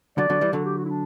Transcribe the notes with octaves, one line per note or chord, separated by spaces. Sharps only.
D3 F#3 D5
D3 F#3
E3 G3
D3 F#3 A4
G4
F#4
E4
D4